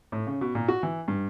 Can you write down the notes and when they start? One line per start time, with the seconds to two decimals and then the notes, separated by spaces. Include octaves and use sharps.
0.12 A2
0.27 C#3
0.41 B2
0.55 A#2
0.68 F#4
0.83 E3
1.08 G2